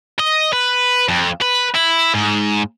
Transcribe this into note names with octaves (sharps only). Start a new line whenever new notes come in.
D#5
B4
F2
B4
E4
G#2